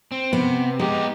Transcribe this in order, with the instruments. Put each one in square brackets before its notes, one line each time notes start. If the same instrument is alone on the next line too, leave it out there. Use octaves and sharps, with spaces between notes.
[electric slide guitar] C4
[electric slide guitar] C3 [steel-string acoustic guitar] B3
[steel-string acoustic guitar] G#3 [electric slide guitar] B3 D#4 [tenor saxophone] G4